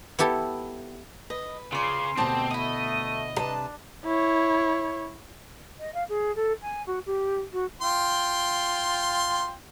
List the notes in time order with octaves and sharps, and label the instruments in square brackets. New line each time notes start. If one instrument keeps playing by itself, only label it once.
[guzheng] B3 E4 G4 A4
[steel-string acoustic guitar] B4 [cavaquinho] D#5
[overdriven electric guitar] C#3 [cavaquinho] F4 D5 [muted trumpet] C6
[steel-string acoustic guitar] D2 B2 [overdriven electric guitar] C4 [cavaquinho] G4 D#5 A5
[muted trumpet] A3 [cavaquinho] E4 D#6 [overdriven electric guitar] D#5
[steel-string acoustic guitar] C3 B4 A5 [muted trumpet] D4
[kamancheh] E4 C#5
[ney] D#5
F5
G#4
A4
G#5
F#4
G4
F#4
[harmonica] F4 G5 C6